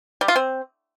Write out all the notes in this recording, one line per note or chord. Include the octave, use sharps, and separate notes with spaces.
G3
F4
C4